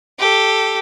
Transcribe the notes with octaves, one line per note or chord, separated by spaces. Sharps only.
G4 A4